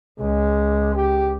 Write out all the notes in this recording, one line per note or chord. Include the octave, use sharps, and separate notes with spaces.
C#2 G#3
G4